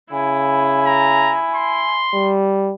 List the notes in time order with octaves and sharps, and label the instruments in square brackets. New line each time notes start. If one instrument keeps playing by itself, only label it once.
[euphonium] C#3 [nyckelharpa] E4 [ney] G#5
[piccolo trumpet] A#5
C6
[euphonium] G3